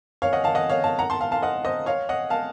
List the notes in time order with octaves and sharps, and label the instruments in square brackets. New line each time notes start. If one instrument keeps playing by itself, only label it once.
[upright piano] C#5 F5
D#5 F#5
F5 A5
D#5 F#5
C#5 F5
F5 A5
F#5 A#5
A5 C6
F5 A5
F5 A5
D#5 F#5
C5 D#5
C#5 F5
D#5 F#5
F5 A5